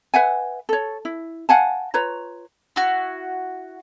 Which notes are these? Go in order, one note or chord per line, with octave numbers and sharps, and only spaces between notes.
B4 E5 F#5 G#5
A4 C#5
E4
F5 F#5 G#5 A5
F4 B4 C#5 A#5
E4 F#4